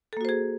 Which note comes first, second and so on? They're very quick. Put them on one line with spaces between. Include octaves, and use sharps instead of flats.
A4 A#3 F#4 C5 G#4